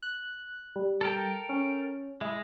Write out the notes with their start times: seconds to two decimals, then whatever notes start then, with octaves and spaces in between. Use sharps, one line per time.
0.03 F#6
0.76 G3
1.01 A4 A#4 G5
1.49 C#4
2.21 G#3 E4